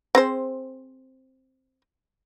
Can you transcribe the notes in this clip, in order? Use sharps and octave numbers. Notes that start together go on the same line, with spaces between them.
C4 G#4 C5